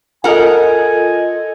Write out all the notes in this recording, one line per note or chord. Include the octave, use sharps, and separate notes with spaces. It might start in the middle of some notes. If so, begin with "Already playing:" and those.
F4 A4 A#4 D#5 F#5 G#5